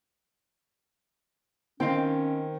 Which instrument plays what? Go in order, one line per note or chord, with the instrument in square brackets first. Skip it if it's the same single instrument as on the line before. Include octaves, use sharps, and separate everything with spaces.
[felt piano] D#3 [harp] C4 [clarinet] C#4 [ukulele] D#5 F5 G5